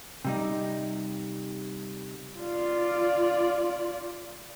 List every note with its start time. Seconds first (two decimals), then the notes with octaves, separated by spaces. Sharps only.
0.25 C3 G3 D#4
2.40 F4 D5